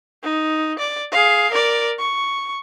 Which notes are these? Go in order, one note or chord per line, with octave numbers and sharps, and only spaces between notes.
D#4
D5
G#4 F5
A#4 D5
C#6